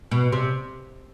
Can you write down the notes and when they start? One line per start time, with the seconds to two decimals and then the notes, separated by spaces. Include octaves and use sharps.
0.11 B2
0.32 C3